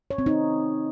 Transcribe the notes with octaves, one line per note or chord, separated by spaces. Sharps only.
C#5
C4
D#4